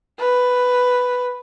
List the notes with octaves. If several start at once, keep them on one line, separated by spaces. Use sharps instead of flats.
B4